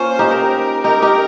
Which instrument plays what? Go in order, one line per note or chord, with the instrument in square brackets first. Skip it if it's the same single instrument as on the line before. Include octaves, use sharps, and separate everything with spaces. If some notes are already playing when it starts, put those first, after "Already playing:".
Already playing: [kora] A#3 C#4 F4 [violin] C5
[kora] D#4 G4
[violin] A#4
[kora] D#4 G4 [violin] A#4
[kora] D#4 G4